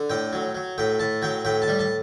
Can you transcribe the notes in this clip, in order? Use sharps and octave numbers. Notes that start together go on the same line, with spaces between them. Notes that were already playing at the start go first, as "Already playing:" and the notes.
Already playing: D3
A2 G5
F#3
F#3
A2 G5
A2 A5
F#3 G5
A2 G5
A5
G3
A5